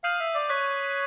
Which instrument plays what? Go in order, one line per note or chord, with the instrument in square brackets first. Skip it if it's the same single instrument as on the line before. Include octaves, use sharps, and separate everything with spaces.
[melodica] F5 [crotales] D#6 G6 C7 D#7 F#7
[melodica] E5
D5
[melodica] C#5 [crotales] C#6 F#6 B6